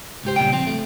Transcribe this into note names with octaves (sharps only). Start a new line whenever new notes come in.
C#2 G#2 G4 C5
A#2 C#3 G3 G5
F3 C4
A3